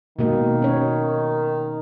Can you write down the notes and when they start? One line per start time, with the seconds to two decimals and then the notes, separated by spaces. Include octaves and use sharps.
0.19 B2 D#3 G#3 A#3
0.62 C#4 C#5